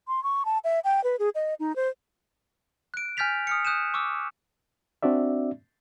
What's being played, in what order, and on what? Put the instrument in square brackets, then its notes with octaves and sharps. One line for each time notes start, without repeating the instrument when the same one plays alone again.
[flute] C6
C#6
A5
E5
G5
B4
G#4
D#5
D#4
C5
[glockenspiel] F#6 D7
G#5 F6 G6 A6 B6 F7
D#6 F6 C#7
D#6 F#6 G6 D#7 E7
C#6 D6 E6
[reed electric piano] C4 D4 F#4 D5 E5